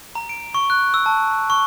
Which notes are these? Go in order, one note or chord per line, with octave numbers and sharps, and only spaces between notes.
A#5
D7
C#6
F#6
E6
A5
C#6